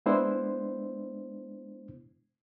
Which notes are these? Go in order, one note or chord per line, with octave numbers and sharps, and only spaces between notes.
G#3 B3 D4 E4 C5